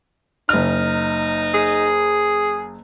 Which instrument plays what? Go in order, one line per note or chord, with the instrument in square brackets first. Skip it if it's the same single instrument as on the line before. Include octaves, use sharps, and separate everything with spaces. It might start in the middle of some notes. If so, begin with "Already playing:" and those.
[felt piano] F#1 F6 [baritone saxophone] D#4
[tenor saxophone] G#4